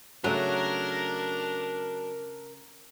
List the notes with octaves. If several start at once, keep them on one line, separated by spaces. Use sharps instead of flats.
C#3 F#3 A3 D4 A#4 E5